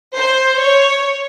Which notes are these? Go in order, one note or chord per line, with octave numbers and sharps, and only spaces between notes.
C5
C#5